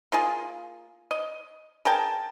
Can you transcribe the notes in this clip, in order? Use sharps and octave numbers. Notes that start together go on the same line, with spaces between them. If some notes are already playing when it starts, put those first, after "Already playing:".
A#3 F4 G#4
D#5
G#4 A#4 G5 A5